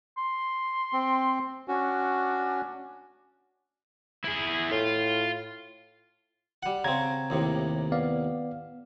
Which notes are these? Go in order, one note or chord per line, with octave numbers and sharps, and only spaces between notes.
C6
C4
C#4 D4 F#4
E4 G#4
A2 F4
G3 F#5
C#3 C4 A#5 G#6
D#2 A2 C3
B3 D5 F5